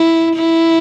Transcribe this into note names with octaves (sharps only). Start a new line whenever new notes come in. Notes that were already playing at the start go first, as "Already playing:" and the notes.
Already playing: E4
E4